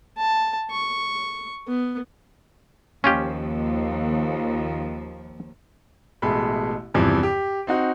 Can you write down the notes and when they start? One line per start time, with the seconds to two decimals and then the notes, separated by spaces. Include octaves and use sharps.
0.18 A5
0.70 C#6
1.67 B3
3.04 D#2 F3 C#4 F4 G4
6.22 A1 B2 G#3 A3 B5
6.94 E2 G2 C3 E3 F3
7.23 G4
7.67 C4 D#4 F#4